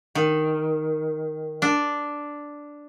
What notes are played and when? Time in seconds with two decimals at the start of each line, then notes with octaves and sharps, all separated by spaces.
0.15 D#3
1.62 D4